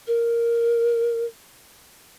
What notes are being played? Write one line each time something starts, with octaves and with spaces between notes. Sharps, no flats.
A#4